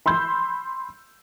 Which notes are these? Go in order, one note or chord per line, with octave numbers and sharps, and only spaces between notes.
B5 C6 E6 G6